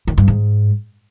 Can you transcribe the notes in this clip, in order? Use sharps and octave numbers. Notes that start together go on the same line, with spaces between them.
D#3
G2
G#2